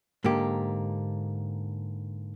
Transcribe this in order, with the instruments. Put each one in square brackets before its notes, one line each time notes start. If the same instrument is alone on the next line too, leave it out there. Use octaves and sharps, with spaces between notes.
[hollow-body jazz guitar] G#2 D3 A#3 G4